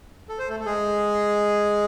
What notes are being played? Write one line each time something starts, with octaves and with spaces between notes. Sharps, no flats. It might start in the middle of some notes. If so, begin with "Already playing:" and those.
A4
C5
A3 A4
A4
G#3 G#4